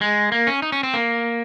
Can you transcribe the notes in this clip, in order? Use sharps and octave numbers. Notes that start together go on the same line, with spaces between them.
G#3
A#3
C#4
D#4
C#4
C4
A#3